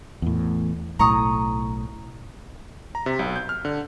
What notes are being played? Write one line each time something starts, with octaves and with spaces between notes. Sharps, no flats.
E2 A2
B1 A2 A#5 C#6 D#6
A#5
C3
B1
G6
F6
D3